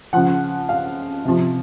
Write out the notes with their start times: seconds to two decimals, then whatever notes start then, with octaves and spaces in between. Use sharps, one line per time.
0.13 C#3 F3 F#5
0.69 F5
1.25 C3 F3